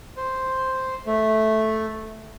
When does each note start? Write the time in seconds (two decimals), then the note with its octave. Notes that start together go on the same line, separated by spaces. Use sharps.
0.17 C5
1.06 A3